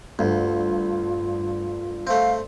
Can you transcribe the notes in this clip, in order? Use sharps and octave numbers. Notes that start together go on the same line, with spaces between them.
D2 G2 F4
A3 C4 F5